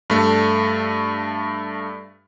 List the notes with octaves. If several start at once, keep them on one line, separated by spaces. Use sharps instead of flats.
G2 A3